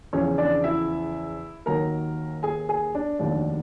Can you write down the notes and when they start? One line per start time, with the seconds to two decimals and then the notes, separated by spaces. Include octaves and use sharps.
0.13 E2 C#3 F3 C#4 C#5
0.38 D4 D5
0.64 E4 E5
1.66 D#2 D#3 F#3 A#4 A#5
2.43 G#4 G#5
2.69 G#4 G#5
2.95 D4 D5
3.19 F1 D#2 D#3 F#3 D4 D5